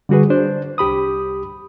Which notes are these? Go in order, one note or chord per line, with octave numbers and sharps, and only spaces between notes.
D3 G3 F#4 G#4 B4
D4 C5
C2 G4 B5 D#6